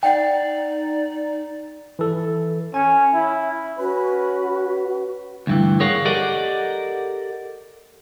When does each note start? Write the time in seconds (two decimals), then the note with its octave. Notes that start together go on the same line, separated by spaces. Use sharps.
0.03 D#4 D5 F#5 G5
1.99 E3 A4
2.74 C#4 G#5
3.14 E4
3.79 C#4 F#4 B4
5.47 D2 G2 E3
5.80 G#4 A#4 C#5 F5 F#5
6.05 G4 A4 A#4 D5 D#5 F#5